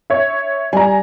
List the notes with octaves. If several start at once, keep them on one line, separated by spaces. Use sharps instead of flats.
C#5 E5
G3 G#5 A#5